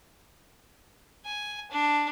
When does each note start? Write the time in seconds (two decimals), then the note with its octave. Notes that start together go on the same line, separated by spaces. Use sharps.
1.25 G#5
1.71 D4